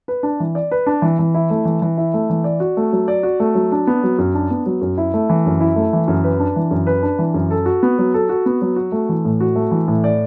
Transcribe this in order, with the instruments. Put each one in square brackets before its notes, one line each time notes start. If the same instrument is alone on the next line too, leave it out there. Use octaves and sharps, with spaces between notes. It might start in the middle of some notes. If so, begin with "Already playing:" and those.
[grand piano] B4
D4
E3
D5
B4
D4
E3
E3
E4
A3
E3
E3
E4
A3
E3
D5
F#4
A3
F#3
D5
F#4
A3
F#3
D4
B3
F#3
F#2
D4
B3
F#3
F#2
E4
A3
E3
F#2
E4
A3
E3
F#2
B4
D4
E3
F#2
B4
D4
E3
F#2
A4
F#4
B3
F#3
A4
F#4
B3
F#3
F#4
A3
E3
A2
F#4
A3
E3
A2
D5